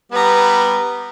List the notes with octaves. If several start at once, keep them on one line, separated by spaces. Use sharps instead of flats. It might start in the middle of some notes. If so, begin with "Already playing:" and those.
G3 B3 B4 A#5